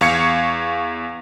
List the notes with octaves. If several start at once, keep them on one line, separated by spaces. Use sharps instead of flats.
E2 F5 C#6 G#6 C#7